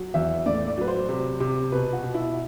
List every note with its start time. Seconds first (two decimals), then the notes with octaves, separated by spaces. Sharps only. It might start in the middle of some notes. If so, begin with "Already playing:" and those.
Already playing: F#3
0.14 E2 E5
0.46 A2 D5
0.67 D5
0.78 F#3 B4
0.87 C5
1.09 C3
1.40 C3
1.72 B2 B4
1.93 F#4
2.04 B2
2.14 E4